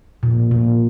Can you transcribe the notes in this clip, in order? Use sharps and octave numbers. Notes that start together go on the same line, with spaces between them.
A#2
A#2